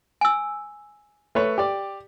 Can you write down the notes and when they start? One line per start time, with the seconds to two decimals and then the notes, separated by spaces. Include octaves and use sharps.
0.21 G#5 E6
1.35 A3 B4 C#5
1.58 G4 D5